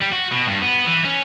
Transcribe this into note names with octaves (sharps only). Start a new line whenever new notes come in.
G3
F#4
B2
G2
B3
E3
C#4